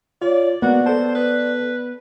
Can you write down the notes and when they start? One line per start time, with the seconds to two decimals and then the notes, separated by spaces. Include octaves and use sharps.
0.22 F4 C#5 D5
0.62 G#3 A#3 B3 F#4 D5
0.86 A4 C5 A5
1.15 B4